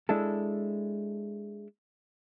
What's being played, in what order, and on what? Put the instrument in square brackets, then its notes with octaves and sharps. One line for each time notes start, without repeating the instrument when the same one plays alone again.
[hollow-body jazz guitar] G#3 D4 E4 A4